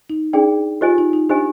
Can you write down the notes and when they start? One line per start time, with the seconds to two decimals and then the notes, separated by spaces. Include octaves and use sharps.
0.10 D#4
0.33 D4 D#4 G#4 D5 G5
0.81 F4 G4 C5 D#5 G#5
0.98 D#4
1.13 D#4
1.29 D4 G4 C5 D#5 G#5